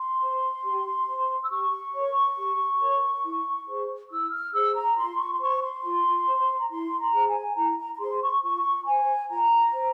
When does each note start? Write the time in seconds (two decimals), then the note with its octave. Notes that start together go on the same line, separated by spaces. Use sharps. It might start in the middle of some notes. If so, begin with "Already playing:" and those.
Already playing: C6
0.21 C5
0.65 G4
1.08 C5
1.43 E6
1.51 G4 C#6
1.94 A#4 C#5
2.38 G4
2.81 A#4 C#5
3.25 E4
3.68 G#4 C5
4.10 E4 E6
4.32 F6
4.54 G#4 C5 E6
4.76 A#5
4.97 F4 C6
5.19 C#6
5.33 C6
5.40 C5 C#6
5.62 C6
5.84 F4
6.27 C5
6.60 A#5
6.70 E4 C6
6.99 A#5
7.13 G#4 C5
7.28 G#5
7.56 E4 A#5
7.79 A#5
7.95 A#5
8.00 G#4 C5 C6
8.22 C#6
8.44 F4 C#6
8.86 C5 G#5
9.30 F4 A#5
9.73 C5